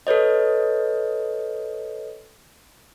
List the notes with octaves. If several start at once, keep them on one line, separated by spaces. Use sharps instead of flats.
A4 B4 C#5 D#5